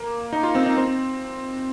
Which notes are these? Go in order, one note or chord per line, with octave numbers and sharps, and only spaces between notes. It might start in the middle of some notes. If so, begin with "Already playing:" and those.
Already playing: A#3
D#4
F4
C4
D#4
C4